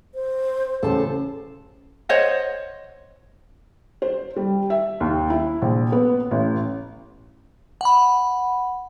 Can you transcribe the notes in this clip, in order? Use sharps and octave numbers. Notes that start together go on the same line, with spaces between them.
C5
A1 C#3 A4 C5 A5
C5 C#5 D#5 F#5
C5
G3
E5
D#2
E4
A#1
B3
A1
F#5 B5